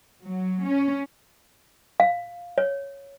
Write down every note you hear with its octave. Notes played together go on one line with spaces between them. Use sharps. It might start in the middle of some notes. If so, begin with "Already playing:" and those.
F#3
C#4
F5
C#5